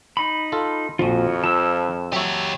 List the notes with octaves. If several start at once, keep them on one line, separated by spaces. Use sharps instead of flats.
D#4 B5
F4 A4
A#1 F2 F3 F4 F#4
F3 A5 E6
F#3 G4 C#5 E5